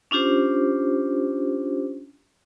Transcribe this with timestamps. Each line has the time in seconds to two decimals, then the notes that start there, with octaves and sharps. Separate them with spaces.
0.11 C#4 D4 F4 G4 C5